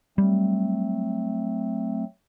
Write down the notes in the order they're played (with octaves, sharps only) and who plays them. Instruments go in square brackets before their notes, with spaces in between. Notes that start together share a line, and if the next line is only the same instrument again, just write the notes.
[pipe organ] F#3 A3 C4 [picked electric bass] G3